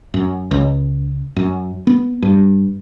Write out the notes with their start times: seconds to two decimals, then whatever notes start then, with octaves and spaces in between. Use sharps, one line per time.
0.14 F#2
0.51 C#2
1.36 F#2
1.87 B3
2.22 G2